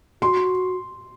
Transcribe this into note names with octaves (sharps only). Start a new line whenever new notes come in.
F#4 C6